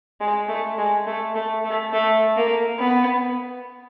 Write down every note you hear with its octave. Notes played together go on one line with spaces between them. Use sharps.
G#3
A3
G#3
A3
A3
A3
A3
A#3
B3